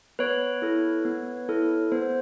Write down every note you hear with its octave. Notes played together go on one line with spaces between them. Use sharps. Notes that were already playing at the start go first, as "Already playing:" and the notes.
B3 B4 C#5
E4 A4
B3
E4 A4
B3 C5